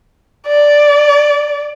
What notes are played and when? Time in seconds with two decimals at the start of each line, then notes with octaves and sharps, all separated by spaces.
0.48 D5